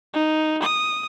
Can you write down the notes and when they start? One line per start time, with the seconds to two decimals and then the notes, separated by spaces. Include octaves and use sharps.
0.14 D#4
0.63 D#6